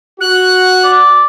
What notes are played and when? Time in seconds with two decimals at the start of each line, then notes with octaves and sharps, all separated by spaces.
0.21 F#4 F#6
0.84 D5